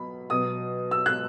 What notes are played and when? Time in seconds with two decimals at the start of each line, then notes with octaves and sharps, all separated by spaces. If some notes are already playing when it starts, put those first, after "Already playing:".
Already playing: B2 F#3 B5
0.30 B2 F#3 D#6
0.91 E6
1.06 F#6